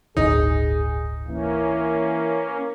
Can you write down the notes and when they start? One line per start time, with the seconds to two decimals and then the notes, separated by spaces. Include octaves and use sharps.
0.17 D1 G1 D2 D#4 G#4
1.28 E3 A#3 C#4